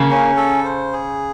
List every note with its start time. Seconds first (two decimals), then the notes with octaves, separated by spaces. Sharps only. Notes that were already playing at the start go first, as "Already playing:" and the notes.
Already playing: C#3 A#3
0.11 C#4
0.37 A4
0.64 C5
0.93 G#4